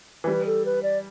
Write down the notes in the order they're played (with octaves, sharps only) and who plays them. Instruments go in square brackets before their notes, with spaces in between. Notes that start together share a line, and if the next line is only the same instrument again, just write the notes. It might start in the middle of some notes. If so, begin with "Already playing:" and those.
[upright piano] E3
[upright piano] G3 [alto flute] B4
[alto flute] A4
B4
D5